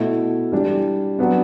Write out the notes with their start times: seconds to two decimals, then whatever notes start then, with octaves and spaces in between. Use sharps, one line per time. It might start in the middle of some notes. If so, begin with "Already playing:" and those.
Already playing: B2 A3 E4
0.52 E3 G3 D4
1.19 F#3 B3 D4